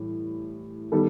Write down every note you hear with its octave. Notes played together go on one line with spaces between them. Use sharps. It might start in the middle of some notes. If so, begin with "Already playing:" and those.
Already playing: A2 E3 G3
D#3 G3 B3 A4